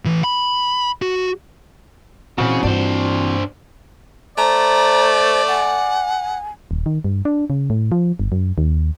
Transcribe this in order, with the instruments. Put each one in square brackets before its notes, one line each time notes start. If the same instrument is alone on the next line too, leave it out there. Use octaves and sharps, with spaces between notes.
[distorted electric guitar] A2 E3
B5
F#4
[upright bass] A#2 [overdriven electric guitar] C#3 C#4 [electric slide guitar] E3 C4 F#4
[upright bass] G2 F4 [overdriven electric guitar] D4 C5
[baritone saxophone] A3 [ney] C5 [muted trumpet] D5 [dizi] A#5
[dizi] F#5 [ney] G#5
[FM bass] D#1
D#3
G2
D4
C#3
A2
F3
G1
F#2
D#2